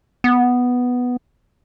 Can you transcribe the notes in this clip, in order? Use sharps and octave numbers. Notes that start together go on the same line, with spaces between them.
B3